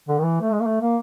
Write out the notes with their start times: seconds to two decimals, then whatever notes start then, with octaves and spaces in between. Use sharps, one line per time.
0.08 D3
0.18 D#3
0.22 E3
0.41 A3
0.52 G#3
0.60 A#3
0.66 A3
0.81 A#3